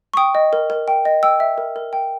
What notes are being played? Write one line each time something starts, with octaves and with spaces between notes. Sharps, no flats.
C#6
G5 D#6
D#5
A#4
A#4
G5
D#5
G5 E6
E5
A#4
A#4
G5